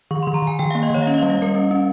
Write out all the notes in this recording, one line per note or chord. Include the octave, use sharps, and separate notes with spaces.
D#3 C#6
D#3 C6
A#5
D#3
G#5
D#3 G5
A#3 F5
D#5
D#3 C#5
F5
C#4 D#5
F5
G3 D#5
F5
G3 A#4
C#4
C#4